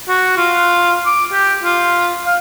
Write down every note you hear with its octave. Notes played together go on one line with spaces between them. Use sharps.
F#4
F4
D6
G4
F4
F5